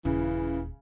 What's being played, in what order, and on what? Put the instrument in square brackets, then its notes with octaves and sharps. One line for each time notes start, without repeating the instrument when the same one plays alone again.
[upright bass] D#1 [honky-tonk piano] C#3 [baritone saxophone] E3